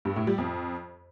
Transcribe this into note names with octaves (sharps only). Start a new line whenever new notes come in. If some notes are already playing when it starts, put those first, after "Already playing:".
G2
A2
G3
F2